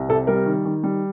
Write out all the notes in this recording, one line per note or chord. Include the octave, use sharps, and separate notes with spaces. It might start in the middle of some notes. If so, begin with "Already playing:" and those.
Already playing: C2
C3 A4
G3 A#4
D#3
D#3
G3